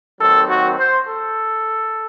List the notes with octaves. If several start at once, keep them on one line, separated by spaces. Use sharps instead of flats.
D#2 D#3 F#3 C4 A4
F#4
C5
A4